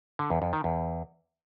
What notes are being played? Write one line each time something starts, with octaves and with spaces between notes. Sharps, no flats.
D3
E2
F2
D#3
E2